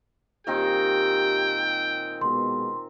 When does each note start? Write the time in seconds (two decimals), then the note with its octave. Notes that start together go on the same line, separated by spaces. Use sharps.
0.47 A#2 D#3 C4 G4 G5
2.21 B2 G#3 B3 C6